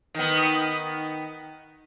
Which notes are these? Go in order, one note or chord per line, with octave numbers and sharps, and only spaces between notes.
D#3 B3